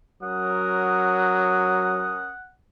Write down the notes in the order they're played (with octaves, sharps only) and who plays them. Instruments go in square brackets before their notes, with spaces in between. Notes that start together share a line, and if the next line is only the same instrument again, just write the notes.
[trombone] F#3 [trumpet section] C#4 A#4 D#6 [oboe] F#5